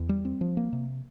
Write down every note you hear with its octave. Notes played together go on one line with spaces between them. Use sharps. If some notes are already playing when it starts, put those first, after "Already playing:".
Already playing: E2
G3
C4
F3
A#3
C3